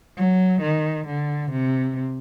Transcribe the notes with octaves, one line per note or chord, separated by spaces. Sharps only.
F#3
D#3
D3
C3